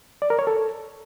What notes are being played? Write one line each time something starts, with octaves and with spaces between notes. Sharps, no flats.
D5
A#4
C#5
A4